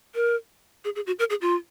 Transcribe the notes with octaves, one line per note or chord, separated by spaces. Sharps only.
A#4
G#4
G#4
F#4
A#4
G#4
F4